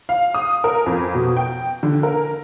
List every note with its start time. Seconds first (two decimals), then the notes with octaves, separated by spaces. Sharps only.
0.09 F5
0.34 D#6
0.64 A#4
0.86 F2
1.15 B2
1.37 G5
1.83 D3
2.03 A#4